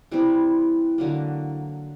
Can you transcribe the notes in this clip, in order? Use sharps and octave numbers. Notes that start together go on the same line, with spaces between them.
E3 G3 C4 E4
D3 F#3 A#3